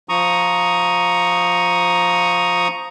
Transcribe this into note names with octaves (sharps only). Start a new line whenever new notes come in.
F3 A#5 C#6 D#6